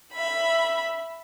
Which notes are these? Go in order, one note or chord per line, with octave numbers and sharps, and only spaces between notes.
E5 B5